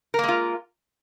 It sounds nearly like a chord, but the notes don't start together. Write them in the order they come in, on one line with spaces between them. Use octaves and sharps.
A#4 A#3 G#3 F4